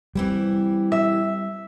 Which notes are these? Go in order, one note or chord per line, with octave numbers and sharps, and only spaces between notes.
E3 G3 A#3 C4 E4 G4
E5